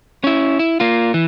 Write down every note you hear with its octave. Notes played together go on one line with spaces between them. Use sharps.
C#4 E4
E4
A#3 F4
E3